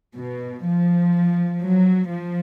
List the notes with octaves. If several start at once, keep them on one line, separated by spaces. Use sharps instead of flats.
B2
F3
F#3
F3